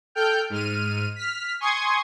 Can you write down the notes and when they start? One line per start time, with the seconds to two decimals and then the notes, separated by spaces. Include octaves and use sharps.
0.15 A4 G5 F6 G6
0.50 G#2 F6 D#7
1.16 F6 B6
1.60 G#5 C6 C#6 D#6 G#6